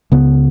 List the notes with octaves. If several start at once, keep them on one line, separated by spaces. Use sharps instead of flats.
C#2 C#3 B3